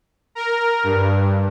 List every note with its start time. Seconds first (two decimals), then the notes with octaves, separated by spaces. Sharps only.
0.35 A#4
0.84 G2